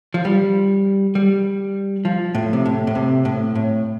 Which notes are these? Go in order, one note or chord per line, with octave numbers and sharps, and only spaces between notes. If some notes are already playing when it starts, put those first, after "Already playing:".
F3
G3
G3
F3
A2
C3
A2
A2
C3
A2
A2